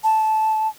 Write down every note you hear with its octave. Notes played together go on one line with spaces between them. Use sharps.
A5